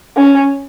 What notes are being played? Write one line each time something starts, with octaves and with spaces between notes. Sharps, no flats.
C#4